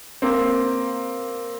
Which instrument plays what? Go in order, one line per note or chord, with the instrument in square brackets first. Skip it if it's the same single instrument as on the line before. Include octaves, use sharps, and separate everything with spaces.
[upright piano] A#3 C4